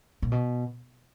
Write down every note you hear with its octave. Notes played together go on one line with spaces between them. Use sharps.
A#2
B2